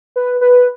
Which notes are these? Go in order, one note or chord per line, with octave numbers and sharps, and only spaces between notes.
B4
B4